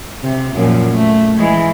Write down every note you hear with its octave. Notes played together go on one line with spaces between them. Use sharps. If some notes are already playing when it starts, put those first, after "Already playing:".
C3
F#2 A#2 F3
A3
E3 G#3